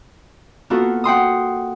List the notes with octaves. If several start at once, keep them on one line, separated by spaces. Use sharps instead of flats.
A#3 B3 F4 F#4 A4
F#5 G5 C6 D#6